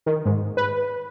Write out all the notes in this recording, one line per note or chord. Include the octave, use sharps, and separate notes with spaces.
D#3
G#2
B4